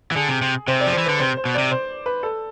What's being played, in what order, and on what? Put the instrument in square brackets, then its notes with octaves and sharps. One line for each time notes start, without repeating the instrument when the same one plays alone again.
[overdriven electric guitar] E3
[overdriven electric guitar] D3 [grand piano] G#4
[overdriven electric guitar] C3
C3
[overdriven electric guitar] C3 [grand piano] C5
[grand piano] D5
[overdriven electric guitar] F3
[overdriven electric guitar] E3 [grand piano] C5
[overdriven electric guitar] D3 [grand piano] B4
[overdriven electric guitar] C3 [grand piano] C5
[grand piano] C5
[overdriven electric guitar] B2
[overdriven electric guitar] C3 [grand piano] D5
[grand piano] C5
B4
A4